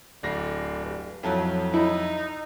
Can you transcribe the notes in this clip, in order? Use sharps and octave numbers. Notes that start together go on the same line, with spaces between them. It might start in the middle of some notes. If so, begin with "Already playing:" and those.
D1 D3 A#6 C7
G2
F2 A2 F3 F#3
D#4 E4